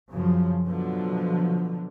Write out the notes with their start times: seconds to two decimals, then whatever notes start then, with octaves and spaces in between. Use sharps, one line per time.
0.11 F#2 C#3 F3
0.66 B2 D3 F3 F#3